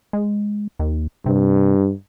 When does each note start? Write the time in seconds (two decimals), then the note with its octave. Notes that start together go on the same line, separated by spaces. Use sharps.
0.13 G#3
0.79 D#2
1.26 G2 C3